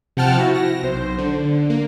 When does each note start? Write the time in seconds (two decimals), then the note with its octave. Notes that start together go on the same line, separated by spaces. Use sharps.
0.17 C3 F3 F#5 G5 A5 F6
0.38 E4 F#4
0.55 A#6
0.82 B1 C5
1.18 D3
1.70 A#3